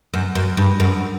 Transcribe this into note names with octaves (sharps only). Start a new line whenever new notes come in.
F#2
F#2
G2
F#2